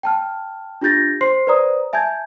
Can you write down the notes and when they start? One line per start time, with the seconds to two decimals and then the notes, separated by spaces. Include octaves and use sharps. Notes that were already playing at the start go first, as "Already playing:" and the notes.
0.03 G5 A5 F6
0.81 D4 F4 G4 G6 A6 A#6
1.21 C5 C6 C7
1.47 B4 C5 D5 A#5 D#6
1.93 E5 G#5 A5 G6 G#6